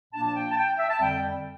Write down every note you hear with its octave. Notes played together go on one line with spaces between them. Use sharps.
A#2 F3 A#3 D4 A5
A5
G5
A5
G5
E5
A5
F2 D3 G3 C4 G5